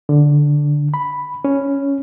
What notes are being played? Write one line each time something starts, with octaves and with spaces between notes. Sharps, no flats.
D3
B5
C#4